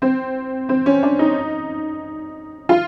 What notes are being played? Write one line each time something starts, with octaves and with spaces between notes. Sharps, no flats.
C4
C4
C#4
D4
D#4
F4